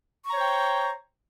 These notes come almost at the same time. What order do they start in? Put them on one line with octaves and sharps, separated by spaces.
C#6 A#5 C#5 C5 G5